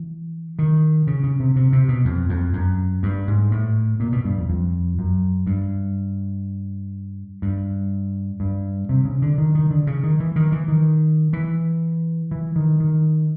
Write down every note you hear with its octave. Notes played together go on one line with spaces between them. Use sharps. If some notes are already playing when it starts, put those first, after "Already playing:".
Already playing: E3
D#3
C#3
C#3
C3
C3
C3
B2
F2
F2
F#2
G2
G#2
A2
A#2
B2
G2
F2
F2
F#2
G2
G2
G2
C3
C#3
D3
D#3
D#3
D3
C#3
D#3
E3
D#3
E3
D#3
E3
E3
D#3
D#3